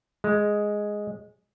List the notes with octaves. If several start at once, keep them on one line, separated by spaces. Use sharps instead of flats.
G#3